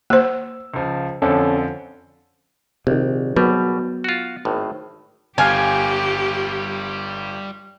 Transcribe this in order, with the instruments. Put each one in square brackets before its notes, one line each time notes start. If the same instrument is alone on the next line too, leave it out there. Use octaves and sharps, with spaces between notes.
[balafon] A#3 C5 [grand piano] E6
[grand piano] C#2 F3
[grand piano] F2 D3 F3 [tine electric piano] C#4 A4
[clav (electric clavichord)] A#1 [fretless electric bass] C3 D#3
[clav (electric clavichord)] G#1 B2 G3 [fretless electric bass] F#3 B3
[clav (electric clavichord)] F4 F#4
G#1 A2
[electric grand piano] G1 F5 F6 [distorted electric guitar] G3 F4 [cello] G4 [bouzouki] G#5